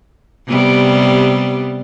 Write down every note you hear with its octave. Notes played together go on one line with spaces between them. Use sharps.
C3 G3 B3